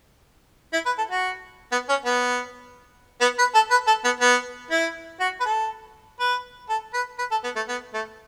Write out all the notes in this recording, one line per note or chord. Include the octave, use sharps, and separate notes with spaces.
E4
B4
A4
F#4
B3
C#4
B3
B3
B4
A4
B4
A4
B3
B3
E4
F#4
B4
A4
B4
A4
B4
B4
A4
B3
A3
B3
A3